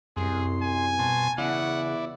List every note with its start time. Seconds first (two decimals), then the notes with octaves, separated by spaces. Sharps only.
0.17 C2 F#2 G#4 C6
0.62 G#5
0.99 B2 A5 C6
1.38 E2 C#3 E4 D5 F#5